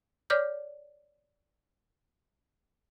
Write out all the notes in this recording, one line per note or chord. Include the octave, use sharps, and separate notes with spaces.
C#5 D5 D6 F6 G6